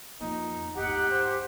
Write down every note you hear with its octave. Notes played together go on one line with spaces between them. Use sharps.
F2 A#2 D#4
G1 D#2 D#4 G4 F#5
A#1 C5